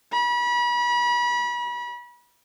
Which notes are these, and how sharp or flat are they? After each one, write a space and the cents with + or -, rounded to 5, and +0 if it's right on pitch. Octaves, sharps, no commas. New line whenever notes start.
B5 -35